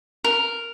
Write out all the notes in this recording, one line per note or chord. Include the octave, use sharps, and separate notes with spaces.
A#4